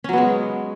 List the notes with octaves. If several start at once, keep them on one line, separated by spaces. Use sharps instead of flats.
F#3 G#3 B3 C#4